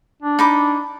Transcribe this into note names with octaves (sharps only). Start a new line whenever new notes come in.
D4
D#4 B5 D6